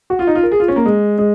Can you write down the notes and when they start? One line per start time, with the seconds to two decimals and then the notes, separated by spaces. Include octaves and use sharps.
0.10 F#4
0.19 F4
0.27 D#4
0.35 F4
0.43 A#4
0.52 G#4
0.60 F4
0.68 C#4
0.76 A#3
0.86 G#3
1.18 G#3